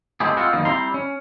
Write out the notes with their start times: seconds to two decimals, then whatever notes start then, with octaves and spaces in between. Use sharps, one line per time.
0.20 G#3 A3 C4 E4 G4 G#4
0.37 G#3 C4 F4 F#4
0.53 F#2 D#3 G3 A#3 D#5
0.65 G3 C4 E4 A#5 C6
0.94 C#4